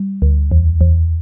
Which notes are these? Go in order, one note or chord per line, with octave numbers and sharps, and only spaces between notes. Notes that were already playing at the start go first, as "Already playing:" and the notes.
Already playing: G3
D2
E2
E2